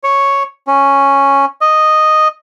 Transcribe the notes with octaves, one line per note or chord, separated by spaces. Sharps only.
C#5
C#4
D#5